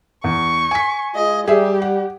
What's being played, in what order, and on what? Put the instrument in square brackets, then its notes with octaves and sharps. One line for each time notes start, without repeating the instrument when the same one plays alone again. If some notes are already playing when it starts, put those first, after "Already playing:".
[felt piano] E2 [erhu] C#6
[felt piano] G#5 B6
[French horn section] G#3 F4 [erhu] D#5
[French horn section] G3 [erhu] G4 [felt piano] G#4 E5
[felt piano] F#5